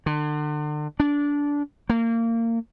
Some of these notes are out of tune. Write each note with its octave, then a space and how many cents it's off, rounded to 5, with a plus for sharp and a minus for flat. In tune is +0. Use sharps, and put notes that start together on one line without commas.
D3 +35
D4 -20
A#3 -25